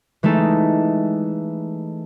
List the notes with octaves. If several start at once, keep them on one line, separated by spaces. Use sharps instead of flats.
E3 G#3 A3 D#4 A4